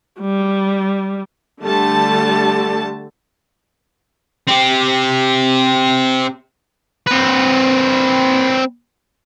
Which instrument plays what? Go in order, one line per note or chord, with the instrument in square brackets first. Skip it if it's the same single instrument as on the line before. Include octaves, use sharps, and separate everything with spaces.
[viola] G3
[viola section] D3 G3 A3 A5
[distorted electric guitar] C4 G4
C4 B4